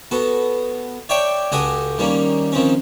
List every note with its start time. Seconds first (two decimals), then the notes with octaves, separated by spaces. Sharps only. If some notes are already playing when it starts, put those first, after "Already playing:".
0.11 B3 F#4 A4
1.09 C#5 D5 E5 G5 A5 C#6
1.52 C#2 F#4 G4 A4 G#5 D#6
1.98 D#3 G3 A#3 C#4
2.52 D#3 F3 C4 C#4